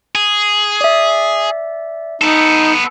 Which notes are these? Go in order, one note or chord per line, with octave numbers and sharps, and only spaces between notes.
G#4
D5 E5
B3 D#4 A4